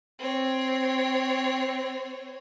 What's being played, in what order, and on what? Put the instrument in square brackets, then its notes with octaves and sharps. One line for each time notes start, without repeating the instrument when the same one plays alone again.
[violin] C4 C#5